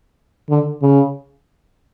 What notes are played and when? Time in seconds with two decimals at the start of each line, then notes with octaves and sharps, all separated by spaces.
0.49 D3
0.82 C#3